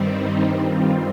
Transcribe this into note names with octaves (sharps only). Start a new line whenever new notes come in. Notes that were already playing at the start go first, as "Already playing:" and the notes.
Already playing: G2 D#3 G3 C4
D#4
F4